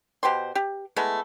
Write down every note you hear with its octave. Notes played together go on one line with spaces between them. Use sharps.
B2 G4 C5 C6
G4
G#3 A3 B3 E4